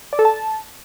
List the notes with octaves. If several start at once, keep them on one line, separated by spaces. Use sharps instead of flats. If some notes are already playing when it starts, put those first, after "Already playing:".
D5
A4
A5